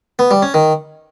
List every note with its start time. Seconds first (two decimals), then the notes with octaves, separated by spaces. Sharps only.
0.19 B3
0.31 G3
0.42 C#4
0.54 D#3